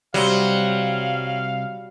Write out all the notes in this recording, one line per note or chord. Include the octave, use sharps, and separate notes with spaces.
C2 F#3 G3 C5 F5